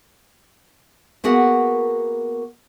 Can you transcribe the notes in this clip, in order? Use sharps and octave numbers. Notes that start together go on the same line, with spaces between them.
A#3 B3 F#4 G#4 A#4 F#5